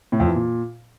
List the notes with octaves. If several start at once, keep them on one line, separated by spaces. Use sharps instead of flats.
A2
F2
E3
A#2